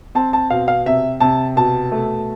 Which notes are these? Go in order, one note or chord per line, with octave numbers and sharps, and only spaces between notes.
C4 A5
A5
B2 F5
F5
C3 E5
C3 A5
B2 A5
A3